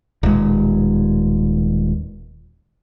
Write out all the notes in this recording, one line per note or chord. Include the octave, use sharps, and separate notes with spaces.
D#1 B2 G#3